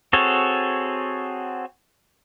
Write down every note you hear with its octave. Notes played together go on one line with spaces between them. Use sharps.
C4 F#4 G#4 A4 C#5